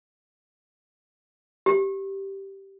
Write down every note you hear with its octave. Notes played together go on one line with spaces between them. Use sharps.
G4